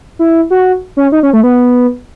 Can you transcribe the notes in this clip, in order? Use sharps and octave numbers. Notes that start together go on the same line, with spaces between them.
E4
F#4
C#4
D#4
C#4
A3
B3